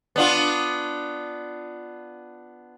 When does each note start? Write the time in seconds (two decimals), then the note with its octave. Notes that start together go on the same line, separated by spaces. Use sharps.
0.16 B3 D4 F4